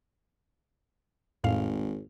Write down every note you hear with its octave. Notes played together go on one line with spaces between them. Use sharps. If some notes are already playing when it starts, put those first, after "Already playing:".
G#1 F2 A2 F5